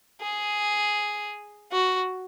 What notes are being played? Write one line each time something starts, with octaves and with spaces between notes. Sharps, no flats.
G#4
F#4